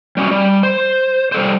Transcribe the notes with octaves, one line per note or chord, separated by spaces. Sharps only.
G3 C#4 F#4
G3
C5
G3 A4 C5